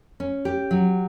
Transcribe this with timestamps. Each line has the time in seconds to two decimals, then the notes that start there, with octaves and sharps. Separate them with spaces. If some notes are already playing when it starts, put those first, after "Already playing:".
0.20 C#4
0.45 G4
0.71 F#3